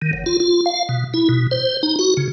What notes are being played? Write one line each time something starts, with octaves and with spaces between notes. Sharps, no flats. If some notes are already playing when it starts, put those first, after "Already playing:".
D#3
F#1
F4
F4
F5
B2
E4
B2
C5
D#4
F#4
C#3